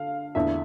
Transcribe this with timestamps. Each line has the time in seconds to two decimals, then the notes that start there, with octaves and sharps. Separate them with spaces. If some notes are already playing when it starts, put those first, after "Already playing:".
Already playing: D3 F5
0.35 E2 D3 A3 D4 E5